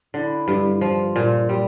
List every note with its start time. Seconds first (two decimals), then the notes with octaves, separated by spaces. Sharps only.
0.14 D3 E4
0.48 G2
0.81 F3 F4
1.16 A#2
1.49 G3